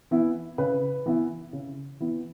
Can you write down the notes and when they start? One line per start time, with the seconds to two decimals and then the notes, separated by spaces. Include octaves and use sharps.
0.11 E3 B3 E4
0.58 C#3 B4
1.06 E3 B3 E4
1.53 C#3
2.00 E3 B3 E4